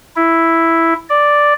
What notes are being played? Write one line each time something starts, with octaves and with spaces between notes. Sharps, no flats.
E4
D5